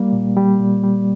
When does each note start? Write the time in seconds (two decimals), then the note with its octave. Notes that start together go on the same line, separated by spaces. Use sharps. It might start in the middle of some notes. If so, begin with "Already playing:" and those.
Already playing: G3 A#3
0.12 A#2
0.36 G3
0.59 A#2
0.83 G3